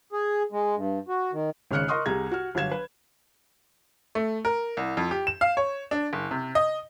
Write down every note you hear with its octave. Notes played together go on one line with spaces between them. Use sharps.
G#4
G#3
G2
F#4
D#3
G#1 C#3 C#5 F6 F#6 C#7
A#4 D#5 C6 C#6 D#6 F6
C2 C3 G#4 A#5 G#6
F#4 F6
G1 F#3 F5 G#6 E7
B4
A3
A#4
C2
F2
G4
E7
F5
C#5
D4
F#1
C3
D#5